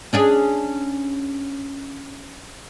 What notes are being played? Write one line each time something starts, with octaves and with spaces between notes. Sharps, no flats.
C#4 D4 G#4